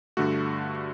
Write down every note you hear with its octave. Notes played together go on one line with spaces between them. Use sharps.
G2 D3 A3 F#4